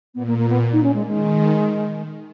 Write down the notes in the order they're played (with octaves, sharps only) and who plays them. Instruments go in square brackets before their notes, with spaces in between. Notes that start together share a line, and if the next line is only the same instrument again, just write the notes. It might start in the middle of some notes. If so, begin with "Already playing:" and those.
[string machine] A#2 [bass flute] B3
[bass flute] A#3
A#3
B3
D#4
C#4
G#3
[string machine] D#3 [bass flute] G#3